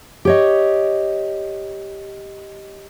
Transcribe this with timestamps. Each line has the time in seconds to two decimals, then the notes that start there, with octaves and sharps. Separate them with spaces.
0.25 G4 C#5 D#5